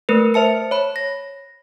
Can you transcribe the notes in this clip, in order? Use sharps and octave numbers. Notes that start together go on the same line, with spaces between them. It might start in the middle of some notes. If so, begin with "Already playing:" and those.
A3 A#4 B4
C5 E5 A5 C#7
C#5 B5
A#6